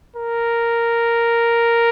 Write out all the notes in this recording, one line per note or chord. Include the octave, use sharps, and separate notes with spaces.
A#4